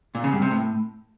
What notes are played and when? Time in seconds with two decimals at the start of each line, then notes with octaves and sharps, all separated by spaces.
0.15 A#2
0.24 C#3
0.33 G2
0.42 C3
0.51 A2